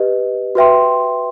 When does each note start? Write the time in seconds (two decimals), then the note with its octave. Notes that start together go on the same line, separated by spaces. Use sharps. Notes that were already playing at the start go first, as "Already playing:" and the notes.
Already playing: G4 B4 D#5
0.55 F#4 B4 E5 G5 C6